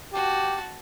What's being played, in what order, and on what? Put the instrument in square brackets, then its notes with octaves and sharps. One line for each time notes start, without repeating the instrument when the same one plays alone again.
[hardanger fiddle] F#4 A5 [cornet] G4